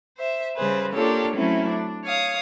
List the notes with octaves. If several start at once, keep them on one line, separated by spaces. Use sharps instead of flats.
C5 E5
C#3 G3 G#4 B4 C5
A#3 D4 F4 G4 A4 C#5
F#3 A3 C4 C#4 E4
D4
C#5 F5 D#6